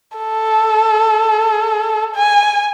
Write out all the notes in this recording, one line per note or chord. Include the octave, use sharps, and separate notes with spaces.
A4
G#5